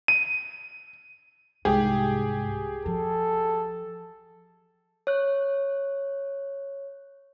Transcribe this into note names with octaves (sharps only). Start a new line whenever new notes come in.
D#7
C2 G#2 G4 G#4
F3 A4
C#5 F#6